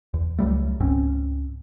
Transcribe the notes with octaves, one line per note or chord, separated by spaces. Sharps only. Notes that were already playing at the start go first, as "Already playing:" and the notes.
E2
C#2 F#3 G3 A3
C#2 G#2 C4 C#4